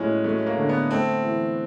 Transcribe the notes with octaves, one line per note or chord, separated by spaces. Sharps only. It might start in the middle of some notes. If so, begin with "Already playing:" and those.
Already playing: A2 F#3 G#3 C#4
F#3 A3
A#3
D3
B3
A3 C4
E3